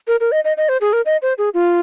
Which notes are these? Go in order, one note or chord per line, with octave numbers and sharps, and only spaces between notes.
A#4
A#4
D#5
D#5
D#5
C5
G#4
A#4
D#5
C5
G#4
F4